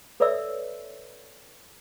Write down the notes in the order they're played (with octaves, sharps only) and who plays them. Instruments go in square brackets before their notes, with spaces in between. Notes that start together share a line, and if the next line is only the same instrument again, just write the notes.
[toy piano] A4 B4 C#5 D5 E5 E6